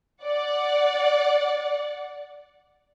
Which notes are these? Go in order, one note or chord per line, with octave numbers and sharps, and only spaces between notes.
D5 F#5